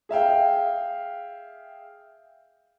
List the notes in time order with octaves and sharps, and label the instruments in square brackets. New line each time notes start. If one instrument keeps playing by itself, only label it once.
[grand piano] G#4 E5 F5 G5